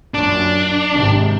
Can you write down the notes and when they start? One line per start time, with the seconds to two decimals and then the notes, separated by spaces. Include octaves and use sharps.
0.14 F#2 A#2 D4
0.93 G#1 G#2 C3